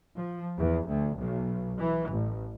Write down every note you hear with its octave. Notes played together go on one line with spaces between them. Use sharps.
F3
E2
D2
B1
E3
A1